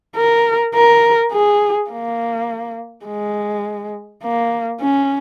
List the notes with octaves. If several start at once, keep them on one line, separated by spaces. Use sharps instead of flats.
A#4
A#4
G#4
A#3
G#3
A#3
C#4